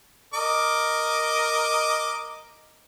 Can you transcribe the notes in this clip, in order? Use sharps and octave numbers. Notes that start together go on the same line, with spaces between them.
A#4 D#5 D6